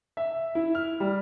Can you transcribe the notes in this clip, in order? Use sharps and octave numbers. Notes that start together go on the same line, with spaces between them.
E5
E4
F6
G3